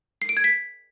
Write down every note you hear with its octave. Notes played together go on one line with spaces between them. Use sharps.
C7
D7
G#6
B6